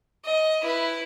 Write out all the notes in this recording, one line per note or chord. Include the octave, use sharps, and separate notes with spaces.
D#5
E4 B4